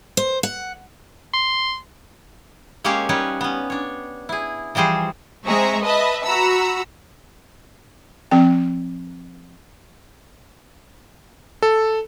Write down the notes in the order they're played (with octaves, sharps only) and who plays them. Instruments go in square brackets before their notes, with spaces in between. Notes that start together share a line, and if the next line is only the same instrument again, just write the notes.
[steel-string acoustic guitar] C5
F#5
[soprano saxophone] C6
[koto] G#3 A#3 C#4 G4 C#5 F5
G3 C#4 D#4 B4 C#5
B3 C#4
D4 C#5
E4 G#4
E3 F3 G3 G#4 C5
[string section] G#3 C4 G#4 E5 A#5 C#6
B4 D#5 E5 A5 B5
F#4 F#5 A#5 B5 E6
[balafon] F3 C4 G5
[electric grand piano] A4